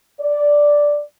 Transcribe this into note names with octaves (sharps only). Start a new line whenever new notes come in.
D5